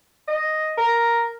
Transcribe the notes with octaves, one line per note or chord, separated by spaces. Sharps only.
D#5
A#4